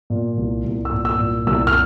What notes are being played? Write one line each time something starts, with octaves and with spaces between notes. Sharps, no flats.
A#2
C2
C2
E6
A#2
E6
A#2
C2 E6
F6